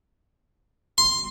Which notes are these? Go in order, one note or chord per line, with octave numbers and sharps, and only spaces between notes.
C6